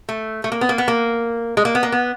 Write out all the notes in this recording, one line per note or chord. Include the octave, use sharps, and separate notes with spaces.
A3
A3
A#3
B3
A#3
B3
A#3
G#3
A#3
B3
A#3
B3